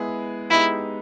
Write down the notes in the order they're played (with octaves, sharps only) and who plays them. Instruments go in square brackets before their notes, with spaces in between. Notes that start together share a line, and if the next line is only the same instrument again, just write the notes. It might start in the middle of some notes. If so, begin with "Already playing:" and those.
Already playing: [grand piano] G#3 B3 E4 G#4
[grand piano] G#3 B3 D#4 G4 [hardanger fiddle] E4